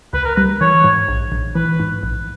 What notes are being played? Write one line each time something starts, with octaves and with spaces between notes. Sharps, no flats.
C#2 B4
A#4
G3 B4
E3 C#5
G#2
A#1
A#1
E3 B4
G#2
A#1